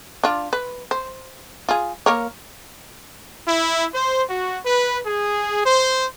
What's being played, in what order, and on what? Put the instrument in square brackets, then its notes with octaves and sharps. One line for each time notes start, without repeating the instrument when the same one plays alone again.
[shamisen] D4 F4
B4
C5
F4 G#4
A#3 A#4 C#5
[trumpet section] E4
C5
F#4
B4
G#4
C5